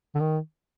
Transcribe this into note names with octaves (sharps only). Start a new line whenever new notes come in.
D3
D#3